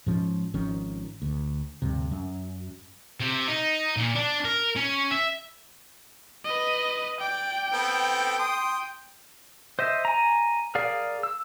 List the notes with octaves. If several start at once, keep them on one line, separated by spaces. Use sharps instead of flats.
G#2 F3 C#4
G#1 D#3 F3 C#4
D2
D2 G2 C3
F#2
C3
D#4
A#2
D4
A#4
C#4
E5
B4 D#5
D5 G5
B3 C4 A4
C6 D#6
C5 D#5 E5
G#5 A#5
G#4 A#4 D5 F5
E6